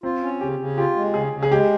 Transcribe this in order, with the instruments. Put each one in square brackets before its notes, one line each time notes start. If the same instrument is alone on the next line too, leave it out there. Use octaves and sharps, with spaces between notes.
[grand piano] C4 [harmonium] F4
[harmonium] C#4
[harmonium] C#3 [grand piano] G4
[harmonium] C#3
[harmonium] F4 [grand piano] G4
[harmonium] G#3
[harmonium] C#3 [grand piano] G#4
[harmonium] C#3
[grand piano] G#4
[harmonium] G#3 [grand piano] G4